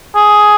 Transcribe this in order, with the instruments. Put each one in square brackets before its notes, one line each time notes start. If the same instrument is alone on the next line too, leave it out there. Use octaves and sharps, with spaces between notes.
[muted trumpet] G#4